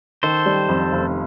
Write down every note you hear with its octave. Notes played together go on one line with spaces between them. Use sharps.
D#3 A4 C5
G3
F2
F1